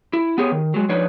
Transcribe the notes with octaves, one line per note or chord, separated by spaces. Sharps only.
E4
B3 G4 G#4 C#5
D#3
F#3 G#3
F3 D4 D#4 B4 C#5 D5